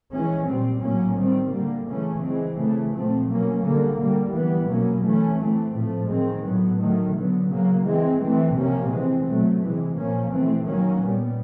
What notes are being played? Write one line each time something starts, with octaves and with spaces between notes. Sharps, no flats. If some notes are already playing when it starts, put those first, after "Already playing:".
E3 G#3 C#4
A#2 G3 C4
A2 F#3 A#3 C#4
D#3 G3 C4
D3 G3 A#3
C#3 E3 A3 C#4
E3 G#3 C4
C#3 E3 A3
A#2 F3 A3 C4
B2 F#3 A#3 C#4
D3 G3 A#3
D3 G3 A#3
E3 G3 B3
B2 F#3 A#3 C#4
E3 A3 C#4
E3 A3 C4
A2 F3 A3
D#3 G#3 C4
A2 F#3 B3
D#3 F#3 A3
D3 F#3 B3
C#3 F#3 A#3
E3 G#3 C4
E3 A3 C4
C3 F3 A#3 C#4
E3 G#3 C4
B2 F#3 A3
C3 E3 G#3
A#2 F3 A#3 C#4
E3 A3 C4
D#3 F#3 A#3 C#4
A#2 G3 B3